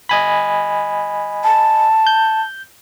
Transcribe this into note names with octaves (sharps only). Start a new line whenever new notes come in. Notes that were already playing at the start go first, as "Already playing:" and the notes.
D#5 G#5 B5
A5
G6